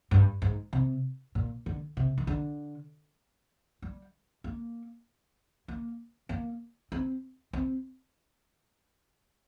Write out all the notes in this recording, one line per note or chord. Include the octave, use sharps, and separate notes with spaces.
G2
G#2
C3
A#2
D3
C3
D#3
D3
G3
A#3
A#3
A#3
C4
C4